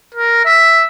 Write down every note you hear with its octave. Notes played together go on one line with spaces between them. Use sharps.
A#4
E5